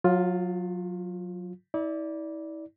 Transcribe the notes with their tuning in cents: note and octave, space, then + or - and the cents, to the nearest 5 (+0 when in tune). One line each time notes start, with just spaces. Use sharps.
F#3 -25 F4 +10
E4 -40 D5 -10